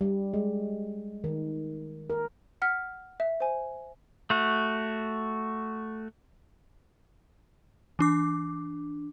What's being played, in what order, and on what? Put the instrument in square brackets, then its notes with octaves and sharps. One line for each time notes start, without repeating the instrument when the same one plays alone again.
[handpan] G3
G#3
D#3
A#4
[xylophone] F#5 F6 B6
E5
C5 G#5
[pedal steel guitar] A3 F#4
[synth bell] E3 D4 D6